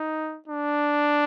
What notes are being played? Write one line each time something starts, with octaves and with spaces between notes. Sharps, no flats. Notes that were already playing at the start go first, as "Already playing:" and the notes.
Already playing: D#4
D4